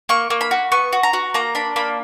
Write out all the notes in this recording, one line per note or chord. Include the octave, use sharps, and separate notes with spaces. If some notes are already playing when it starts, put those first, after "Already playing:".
A#3 C#6
A#3
B5
F#4
B3 C#6
F#4
A#5
F#4
A#3 A#5
D4 B5
A#3 B5